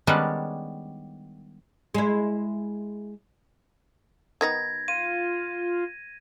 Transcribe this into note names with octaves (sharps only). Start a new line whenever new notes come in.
D#3 G3 G#3 B3 C#4 D4
G#3 E4
D#3 B3 D#4 G#6 A#6
F4 D#7